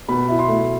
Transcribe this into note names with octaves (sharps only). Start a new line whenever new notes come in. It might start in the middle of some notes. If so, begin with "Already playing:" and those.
B2 B5
E4
C6
A3